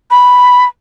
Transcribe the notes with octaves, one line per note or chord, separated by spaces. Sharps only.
B5